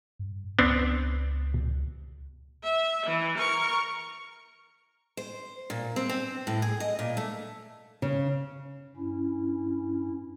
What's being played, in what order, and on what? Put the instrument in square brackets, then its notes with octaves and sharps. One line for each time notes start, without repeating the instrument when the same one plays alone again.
[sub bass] G2
[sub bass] C#2 [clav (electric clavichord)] B3 C4 D4
[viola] E5
E3
A#4 C#6
[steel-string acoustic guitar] C5
A#2
C4
C4
A2
G#4
D#5
A#2
A3
[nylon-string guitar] C#3
[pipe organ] G2 C#4 E4